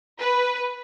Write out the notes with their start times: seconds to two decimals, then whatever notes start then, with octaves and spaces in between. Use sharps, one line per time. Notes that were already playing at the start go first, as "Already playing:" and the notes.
0.20 B4